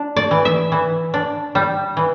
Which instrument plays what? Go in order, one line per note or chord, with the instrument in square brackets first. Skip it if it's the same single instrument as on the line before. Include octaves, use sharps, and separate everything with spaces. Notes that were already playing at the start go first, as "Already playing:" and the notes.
Already playing: [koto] D4
D5
E3
E5
E3
D4
G3
E3